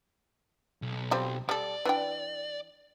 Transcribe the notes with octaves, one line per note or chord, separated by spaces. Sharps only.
B1
G3 C4 F4
G3 A4 D5
E3 D4 G5